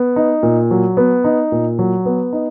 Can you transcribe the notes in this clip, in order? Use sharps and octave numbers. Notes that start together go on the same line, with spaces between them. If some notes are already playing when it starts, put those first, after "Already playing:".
Already playing: B3
D#4
A#2
F#3
B3
D#4
A#2
F#3
B3
D#4